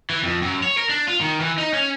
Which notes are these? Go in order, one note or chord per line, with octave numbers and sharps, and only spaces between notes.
E3
F2
F#2
C#5
A#4
D4
F4
D#3
E3
D#4
C#4